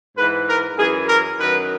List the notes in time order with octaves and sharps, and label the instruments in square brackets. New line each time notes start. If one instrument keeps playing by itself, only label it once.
[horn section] G#2 E3 B4
A#4
F#2 E3 G#4
A#4
F#2 D#3 F#3 B4